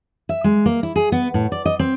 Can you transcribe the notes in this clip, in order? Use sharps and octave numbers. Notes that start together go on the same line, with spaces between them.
E5
G#3
A#3
E4
G#4
B3
A2
D5
D#5
C4